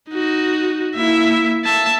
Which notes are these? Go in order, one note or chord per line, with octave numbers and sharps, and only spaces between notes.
D#4 F#4
A#3 E4 E5
A#3 E5 A5